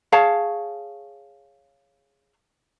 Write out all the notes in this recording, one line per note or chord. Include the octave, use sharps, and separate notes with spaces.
G#4 C#5 F5 A5